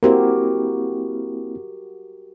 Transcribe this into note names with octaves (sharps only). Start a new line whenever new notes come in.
A#3 C4 E4 F#4 G4 A#4